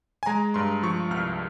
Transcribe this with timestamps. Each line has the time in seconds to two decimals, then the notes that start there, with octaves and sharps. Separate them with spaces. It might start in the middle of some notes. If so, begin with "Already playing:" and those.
0.23 G#5
0.26 G#3 A#5
0.54 G2 C6
0.83 F3 C#6
1.11 C2 F6